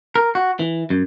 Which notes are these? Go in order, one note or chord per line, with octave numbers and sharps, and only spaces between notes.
A#4
F#4
E3
F#2